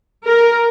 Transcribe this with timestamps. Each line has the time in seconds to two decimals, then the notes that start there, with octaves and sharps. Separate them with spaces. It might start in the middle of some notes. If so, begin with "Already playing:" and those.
0.24 A#4